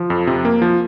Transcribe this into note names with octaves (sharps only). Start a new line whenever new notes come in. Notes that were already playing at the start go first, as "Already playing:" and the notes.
Already playing: F3
F2
C3
A#3
F3